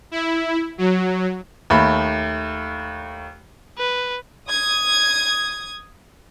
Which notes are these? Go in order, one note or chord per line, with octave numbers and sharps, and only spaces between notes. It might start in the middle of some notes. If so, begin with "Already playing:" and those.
E4
F#3
D#2 A3 B5
B4
D#6 G#6